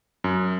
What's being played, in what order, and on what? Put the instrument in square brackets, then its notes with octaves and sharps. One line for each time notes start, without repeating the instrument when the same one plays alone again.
[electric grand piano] F#2